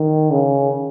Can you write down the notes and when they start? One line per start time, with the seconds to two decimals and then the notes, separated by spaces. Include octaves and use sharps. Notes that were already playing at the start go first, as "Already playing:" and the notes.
Already playing: D#3
0.31 C#3